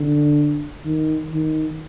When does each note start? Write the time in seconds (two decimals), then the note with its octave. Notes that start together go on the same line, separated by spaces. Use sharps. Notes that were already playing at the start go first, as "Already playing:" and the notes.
Already playing: D3
0.85 D#3
1.32 D#3